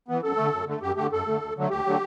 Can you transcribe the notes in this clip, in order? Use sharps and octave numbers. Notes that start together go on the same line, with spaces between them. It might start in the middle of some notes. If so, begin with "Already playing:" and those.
E3 B3
F#2 A4
D3 A3
F#2
D3 A3
F#2 G4
D3 A3 G4
F#2 A4
D3 A3
D2
D3 F#3 A3
D2 G4
D3 F#3 A3